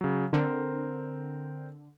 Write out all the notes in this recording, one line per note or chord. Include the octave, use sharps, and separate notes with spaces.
C#3 F#3
D3 C4 A#4 C5